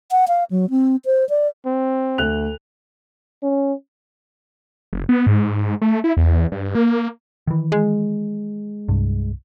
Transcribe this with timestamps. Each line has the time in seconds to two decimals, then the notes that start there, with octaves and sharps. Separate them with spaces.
0.11 F#5
0.28 F5
0.51 F#3
0.70 C4
1.05 C5
1.29 D5
1.66 C4
2.18 D2 F#6 F7
3.43 C#4
4.93 F#1
5.09 B3
5.27 G#2
5.82 A3
6.04 E4
6.17 E2
6.52 G2
6.75 A#3
7.47 D#3 E3
7.72 G#3
8.89 C2 G2